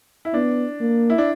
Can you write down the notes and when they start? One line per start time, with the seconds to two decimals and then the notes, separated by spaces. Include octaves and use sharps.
0.25 E4
0.34 B3 D4
0.81 A#3
1.10 E4
1.18 D4